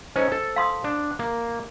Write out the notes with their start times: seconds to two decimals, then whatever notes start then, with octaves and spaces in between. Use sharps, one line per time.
0.16 C#4 D#4 A4 C5
0.32 A4
0.56 F5 C6 D#6
0.84 D4
1.19 A#3